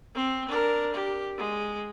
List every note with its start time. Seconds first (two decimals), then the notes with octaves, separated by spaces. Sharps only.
0.15 C4
0.49 D4 A#4
0.94 G4
1.38 G#3